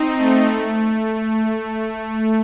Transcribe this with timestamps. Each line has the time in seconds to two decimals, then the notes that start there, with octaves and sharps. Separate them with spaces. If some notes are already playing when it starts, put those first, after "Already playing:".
Already playing: C4 D#4
0.18 A3
0.47 A3